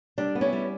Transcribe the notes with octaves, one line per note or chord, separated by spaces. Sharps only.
G3 D4
B3
C#4 E4
G3